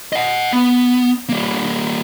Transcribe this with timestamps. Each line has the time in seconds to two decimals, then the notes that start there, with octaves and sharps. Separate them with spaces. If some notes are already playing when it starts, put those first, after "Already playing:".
0.13 D#5 F#5
0.53 B3
1.29 G3 A#3